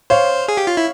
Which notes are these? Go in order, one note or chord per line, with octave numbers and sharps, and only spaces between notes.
C5 C#5 F5
G#4
G4
F4
E4